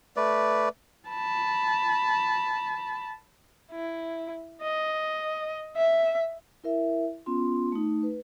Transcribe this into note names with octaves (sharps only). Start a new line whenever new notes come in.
A3 B4 D5
A5 B5
E4
D#5
E5
E4 A#4 E5
B3 C#4 F4 C6
A3 D#4
B4